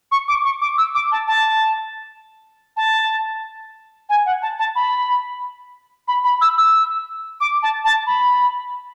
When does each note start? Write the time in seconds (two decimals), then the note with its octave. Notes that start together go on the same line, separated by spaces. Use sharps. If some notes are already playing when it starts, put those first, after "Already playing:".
0.11 C#6
0.28 D6
0.44 C#6
0.61 D6
0.78 E6
0.95 D6
1.11 A5
1.27 A5
2.77 A5
4.09 G#5
4.26 F#5
4.42 A5
4.59 A5
4.75 B5
6.08 B5
6.24 B5
6.41 E6
6.58 E6
7.41 D6
7.63 A5
7.85 A5
8.07 B5